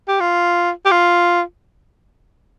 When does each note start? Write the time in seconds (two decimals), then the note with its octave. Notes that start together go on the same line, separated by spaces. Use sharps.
0.08 G4
0.20 F4
0.85 G4
0.91 F4